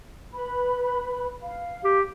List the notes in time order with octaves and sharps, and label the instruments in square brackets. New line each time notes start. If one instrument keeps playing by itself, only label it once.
[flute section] B4 B5
F5
[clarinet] G4